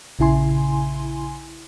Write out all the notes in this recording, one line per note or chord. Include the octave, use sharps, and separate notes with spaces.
A#1 C#3 E4 G#5 C6